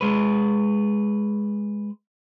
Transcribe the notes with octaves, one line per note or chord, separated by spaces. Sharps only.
G#3 B4